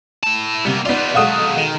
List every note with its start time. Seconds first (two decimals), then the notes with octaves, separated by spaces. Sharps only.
0.23 E4 A5
0.65 C3 G3 A#3 B3
0.86 G3 B3 D#4 F4 D5
1.15 B2 F#3 G#3 A3 A4 F5 F#5 D#6
1.58 D#3